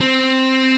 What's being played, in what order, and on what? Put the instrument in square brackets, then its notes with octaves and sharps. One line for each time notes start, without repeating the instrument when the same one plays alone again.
[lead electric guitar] C4